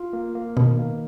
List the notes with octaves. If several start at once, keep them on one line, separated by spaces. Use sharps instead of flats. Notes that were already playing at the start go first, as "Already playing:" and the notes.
Already playing: F4
A#3
A#3
B2 D#3
A#3